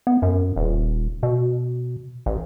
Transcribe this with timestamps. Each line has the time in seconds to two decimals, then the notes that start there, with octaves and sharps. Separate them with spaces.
0.07 B3
0.22 F#2
0.56 D#1
1.23 B2
2.26 A1